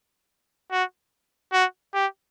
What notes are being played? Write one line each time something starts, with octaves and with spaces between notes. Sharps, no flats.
F#4
F#4
G4